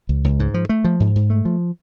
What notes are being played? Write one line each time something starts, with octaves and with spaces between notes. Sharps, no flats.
C#2
C#2
G#2
F3
A3
F3
G#2
G#2
A3
F3